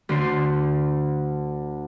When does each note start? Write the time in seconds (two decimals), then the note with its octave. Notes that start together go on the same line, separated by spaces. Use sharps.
0.09 D2 D3 C6